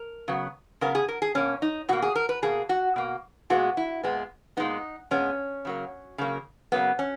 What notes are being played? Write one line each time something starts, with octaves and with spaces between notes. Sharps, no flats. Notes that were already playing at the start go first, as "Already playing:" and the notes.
Already playing: A#4
C#3 F#3 B3
C#3 F#3 B3 A#4
G#4
A#4
G#4
B2 A#3 C#4
D#4
B2 A#3 F#4
G#4
A#4
B4
B2 A#3 G#4
F#4
B2 A#3
A#2 G#3 B3 F#4
E4
A#2 G#3 B3
A#2 G#3 B3 D#4
A#2 G#3 B3 C#4
C#3 F#3 A#3
C#3 F#3 A#3
C#3 F#3 A#3 B3
C#4